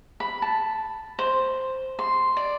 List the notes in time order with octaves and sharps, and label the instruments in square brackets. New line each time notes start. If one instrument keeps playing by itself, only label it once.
[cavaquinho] B5
A5
C5
C6
D5